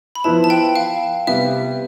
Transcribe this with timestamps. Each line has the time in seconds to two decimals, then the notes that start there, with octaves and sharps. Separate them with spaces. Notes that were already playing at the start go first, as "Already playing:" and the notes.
0.15 B5
0.24 F3 B3 E4 B4 A5
0.44 A5
0.50 G5
0.76 F5
1.27 C3 G3 B3 E5